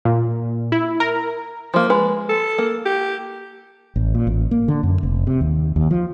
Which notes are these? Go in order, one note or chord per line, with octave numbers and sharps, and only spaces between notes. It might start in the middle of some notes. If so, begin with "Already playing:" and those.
A#2
E4
A#4
F3 A#3
G#3 B4
A4
A#3
G4
A1
A#2
A1
A#3
D3
F#2
F1
C3
D#2
D#2
F3